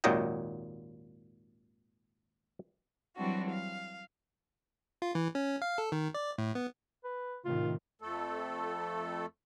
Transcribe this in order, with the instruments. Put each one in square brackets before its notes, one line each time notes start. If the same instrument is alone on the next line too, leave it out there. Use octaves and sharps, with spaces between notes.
[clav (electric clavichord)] G#1 D#2 A#2 F#3 D#5 G5
[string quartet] E3 F#3 G3 C4 D4 F#4
F5
[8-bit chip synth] F4
E3
C#4
F5
A4
D#3
D5
A2
B3
[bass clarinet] B4
[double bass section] A2 C3 D#3 [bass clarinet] F4
[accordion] F2 A3 A4